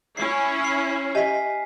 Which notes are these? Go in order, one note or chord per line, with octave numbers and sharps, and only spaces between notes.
C#4 E4 C7
F6 C7
G4 D#5 E5 G#5 B6